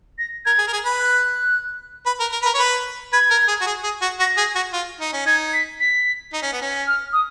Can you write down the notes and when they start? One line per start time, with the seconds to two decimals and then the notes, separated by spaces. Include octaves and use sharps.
0.18 A#6
0.45 A#4 G#6
0.58 G#4
0.67 A#4
0.73 G#4
0.85 B4
0.99 F#6
2.06 B4
2.20 A#4
2.32 A#4
2.42 B4
2.46 A#4
2.55 C#5
2.59 B4
3.13 B4 G#6
3.30 A#4
3.48 G#4
3.61 F#4
3.66 G#4
3.83 G#4
4.01 F#4
4.19 F#4 A#6
4.37 G#4
4.55 F#4
4.73 F4
5.00 D#4
5.13 C#4
5.26 D#4 G#6
5.53 B6
5.80 B6
6.33 D#4
6.42 C#4
6.52 B3
6.61 C#4
6.87 F6
7.13 D#6